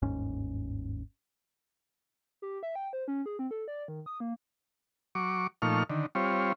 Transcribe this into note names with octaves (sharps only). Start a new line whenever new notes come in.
G1 D#2 G#2 C#4
G4
E5
G5
C5
C#4
G#4
C4
A4
D5
D#3
D#6
A#3
F#3 C#6 D6
A#2 F3 A3 D#4 C#6 F6
D3 D#3
G3 C4 F4 C#5